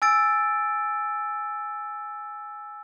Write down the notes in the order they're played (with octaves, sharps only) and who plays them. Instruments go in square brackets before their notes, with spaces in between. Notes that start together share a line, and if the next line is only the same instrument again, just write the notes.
[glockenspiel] G#5 E6 A6 D7